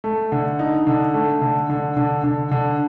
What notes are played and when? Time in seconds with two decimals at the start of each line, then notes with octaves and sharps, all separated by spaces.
0.04 A3
0.32 D3
0.59 D#4
0.87 D3
1.14 A3
1.42 D3
1.70 D3
1.97 D3
2.24 D3
2.51 D3